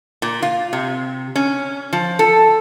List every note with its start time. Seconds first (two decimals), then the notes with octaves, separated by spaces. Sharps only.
0.22 A#2
0.42 F4
0.73 C3
1.36 C#4
1.93 F3
2.19 A4